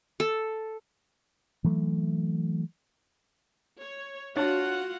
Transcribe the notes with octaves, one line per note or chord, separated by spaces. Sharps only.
A4
E3 F#3 A3
C#5
D4 F4 F#4 C#5 F#5 A5